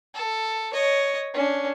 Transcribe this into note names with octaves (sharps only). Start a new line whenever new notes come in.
A4
C#5 D#5
C#4 D4